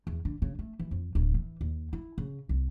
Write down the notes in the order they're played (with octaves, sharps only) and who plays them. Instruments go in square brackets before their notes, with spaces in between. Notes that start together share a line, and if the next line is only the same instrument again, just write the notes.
[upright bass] E2
D3
C#3
A3
E3
F2
D1
E3
D#2
E4
C#3
C2